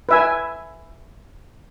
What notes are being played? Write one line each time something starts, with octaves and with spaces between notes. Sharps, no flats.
B4 E5 G#5